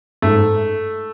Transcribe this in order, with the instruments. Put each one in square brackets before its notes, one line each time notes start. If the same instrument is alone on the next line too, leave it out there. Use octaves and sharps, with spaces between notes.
[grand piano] G#2 [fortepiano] A3